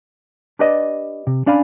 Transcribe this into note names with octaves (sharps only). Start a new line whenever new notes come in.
D4 G4 B4 D5 D#5
C3
C#4 D4 D5 F5 G#5 B5